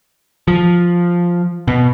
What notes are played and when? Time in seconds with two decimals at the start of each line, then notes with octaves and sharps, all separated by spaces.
0.48 F3
1.68 B2